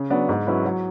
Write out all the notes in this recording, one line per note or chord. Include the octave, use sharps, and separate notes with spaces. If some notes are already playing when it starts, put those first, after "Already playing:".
Already playing: C#3
F#3 B3 D4
G#2
F#3 C#4 E4 B4
F#3